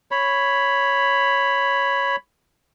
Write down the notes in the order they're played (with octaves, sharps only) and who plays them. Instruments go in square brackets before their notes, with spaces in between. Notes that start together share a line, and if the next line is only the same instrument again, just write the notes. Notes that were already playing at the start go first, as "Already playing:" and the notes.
[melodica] C#5 B5